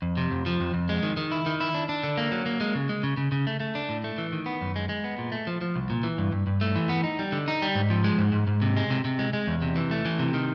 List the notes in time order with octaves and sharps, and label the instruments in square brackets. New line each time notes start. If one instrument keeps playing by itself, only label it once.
[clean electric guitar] F2
C3
F2
F3
F2
F2
G#3
D#3
D#3
E4
D#3
E4
D4
D4
D3
A#3
F#3
A#3
G#3
C#3
G#3
C#3
C#3
C#3
A3
A3
D4
A2
A3
E3
D#3
B3
F#2
G#3
G#3
B3
A#2
A3
F3
F3
C2
A#2
E3
G2
G2
G2
A3
E3
B3
D#4
G3
D3
D#4
G3
G#2
F3
G#3
G#2
G#2
G#2
C3
G#3
C3
C3
G#3
G#3
E2
C3
E3
A3
E3
C3
D#3